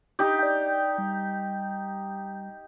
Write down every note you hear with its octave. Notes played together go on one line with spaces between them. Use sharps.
D#4 G4
D5 G5
G3